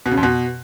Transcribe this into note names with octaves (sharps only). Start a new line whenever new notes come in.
B2
C#3
F2
B2